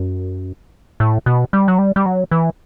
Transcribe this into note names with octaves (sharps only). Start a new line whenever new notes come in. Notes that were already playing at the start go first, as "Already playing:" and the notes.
Already playing: F#2
A2
B2
G3
F#3
G3
G3
F#3
E3